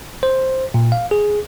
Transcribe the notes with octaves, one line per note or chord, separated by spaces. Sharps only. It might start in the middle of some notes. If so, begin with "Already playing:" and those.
C5
A#2
F5
G#4